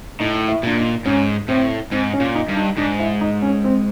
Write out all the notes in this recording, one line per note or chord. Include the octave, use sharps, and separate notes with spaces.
A2 D#4
E4
A#2 D4
D#4
G#2 C#4
A2 C4
G#2 C4
C#4
A#2
D#4
G2
D#4
G#2 D4
E4
D#4
C#4
C4